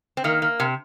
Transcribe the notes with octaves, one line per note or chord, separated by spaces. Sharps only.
C4
D#3 A#3
A#3
C3